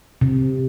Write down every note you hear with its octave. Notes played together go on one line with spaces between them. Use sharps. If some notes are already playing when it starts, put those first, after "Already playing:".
C3